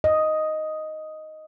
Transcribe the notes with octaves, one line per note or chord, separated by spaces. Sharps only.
D#5